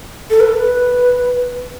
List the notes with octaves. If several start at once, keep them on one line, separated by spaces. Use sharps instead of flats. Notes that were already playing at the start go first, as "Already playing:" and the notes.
A4
B4